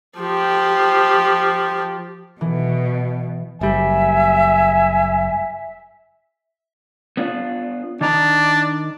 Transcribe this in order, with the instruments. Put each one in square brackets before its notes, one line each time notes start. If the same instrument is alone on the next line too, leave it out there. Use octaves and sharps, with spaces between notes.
[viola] F3 G4
[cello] B2 [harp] E3
[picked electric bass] F#1 G3 [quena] E5 [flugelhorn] G#5
[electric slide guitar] B3 D4 F4
[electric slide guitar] D#3 A#5 [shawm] D4